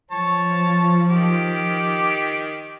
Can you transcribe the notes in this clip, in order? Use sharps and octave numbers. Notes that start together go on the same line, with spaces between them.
F3 C#5 A5
D#3 G4 D6